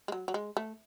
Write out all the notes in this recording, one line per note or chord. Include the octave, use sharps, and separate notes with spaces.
G#3
F#3
F#3
G#3
A3